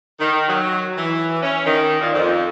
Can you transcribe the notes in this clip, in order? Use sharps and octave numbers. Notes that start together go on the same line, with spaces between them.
D#3
F#3
E3
C#4
D#3
A#2
F2